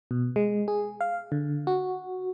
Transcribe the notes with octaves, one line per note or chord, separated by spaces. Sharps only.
B2
G#3
G#4
F5
D3
F#4